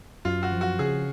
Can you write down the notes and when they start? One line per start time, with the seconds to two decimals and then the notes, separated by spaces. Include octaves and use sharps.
0.25 F#2 F4
0.43 F#4
0.52 F3
0.61 F#4
0.79 C#3 G#4